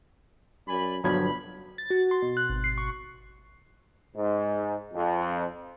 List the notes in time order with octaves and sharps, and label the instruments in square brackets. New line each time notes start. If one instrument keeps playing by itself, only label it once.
[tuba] F#2 [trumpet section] D5 G#5 B5
[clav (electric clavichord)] G1 G2 F3 [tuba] B2 [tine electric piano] F#3 G#6 [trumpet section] B5
[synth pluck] A6
F#4
C6
B2
F#6
G#1
C7
C#6
[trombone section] G#2
F2